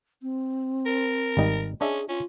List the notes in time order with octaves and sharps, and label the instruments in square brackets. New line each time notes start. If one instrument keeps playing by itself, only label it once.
[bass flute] C4
[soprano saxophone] A#4
[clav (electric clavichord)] G#1 G3 D#4
[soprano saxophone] C#4 [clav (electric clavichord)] D4 D#5 E5 [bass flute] G#4
[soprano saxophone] C#4 [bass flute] F4